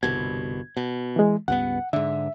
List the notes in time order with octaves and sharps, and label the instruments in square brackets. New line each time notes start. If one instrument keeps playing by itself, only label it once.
[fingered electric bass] G1 C2 B2 [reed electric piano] G#6
[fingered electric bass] B2
[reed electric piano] E3 G#3
[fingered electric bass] C#2 G2 B3 [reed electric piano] F#5
[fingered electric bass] G#2 D3 [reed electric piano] E5